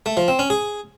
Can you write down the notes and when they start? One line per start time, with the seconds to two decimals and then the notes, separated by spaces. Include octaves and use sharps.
0.06 A3
0.17 F3
0.28 C4
0.39 C#4
0.50 G#4